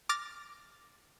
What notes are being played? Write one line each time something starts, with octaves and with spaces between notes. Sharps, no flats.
D6 F6 A6 A#6